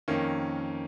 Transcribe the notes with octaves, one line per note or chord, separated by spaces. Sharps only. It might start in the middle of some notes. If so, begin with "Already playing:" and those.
F2 D#3 A#3 C#4